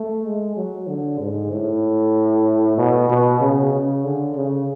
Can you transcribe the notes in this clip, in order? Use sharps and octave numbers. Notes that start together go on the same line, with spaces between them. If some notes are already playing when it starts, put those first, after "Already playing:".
Already playing: A3
G#3
F#3
D3
G#2
A2
B2
B2
C#3
C#3
D3
C#3